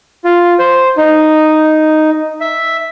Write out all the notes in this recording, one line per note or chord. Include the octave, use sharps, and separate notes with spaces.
F4
C5
D#4
E5